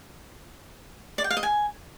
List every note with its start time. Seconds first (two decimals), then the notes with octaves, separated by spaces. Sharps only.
1.18 D5
1.24 G5
1.30 F5
1.37 D#5
1.43 G#5